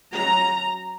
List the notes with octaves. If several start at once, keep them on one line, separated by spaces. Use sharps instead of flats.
F#3 C#4 A#5